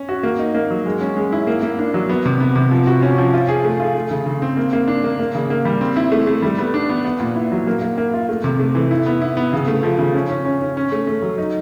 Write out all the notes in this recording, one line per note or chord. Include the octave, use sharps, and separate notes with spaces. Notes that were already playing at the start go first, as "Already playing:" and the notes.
Already playing: C#4
F#4
A#3
D#4
A#3
F#3
G#3
C#4
G#3
E4
A#3
A#3
D4
F#3
B3
C3
B3
C3
F3
F#4
C#4
F3
F4
G#4
A3
F4
A3
C#3
C#3
C4
A#3
A#3
D4
A#3
A#3
C#3
A#3
G3
C4
E4
A3
A3
G3
B3
D4
B3
B3
A#2
E4
F#3
A#3
A#3
A#3
F4
A3
C3
A3
E3
E4
B3
E4
B3
C#3
A3
F3
C#3
C#4
C#4
C#4
C#4
C#4
A3
A3
F#3
D#4